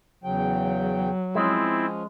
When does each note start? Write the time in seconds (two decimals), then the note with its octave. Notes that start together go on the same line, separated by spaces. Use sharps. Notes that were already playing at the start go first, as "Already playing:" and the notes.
0.24 E2 C#3 F#3 G5
1.35 F3 G#3 C4 C#4 E4